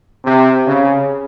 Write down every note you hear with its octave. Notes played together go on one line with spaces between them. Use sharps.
C3
C#3